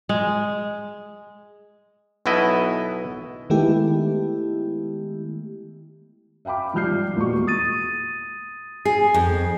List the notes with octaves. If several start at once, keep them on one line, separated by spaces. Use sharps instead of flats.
G#3
B1 B2 B3 E4 D#5 E5
D#3 G#3 A3 B3 E4 G4
E5 F5 G5 B5 D6
G#2 F3 G3 F6 G6 C7
E2 A#2 G#3 F#4 C#6
D#6 A6 D#7
G#4 C7
F2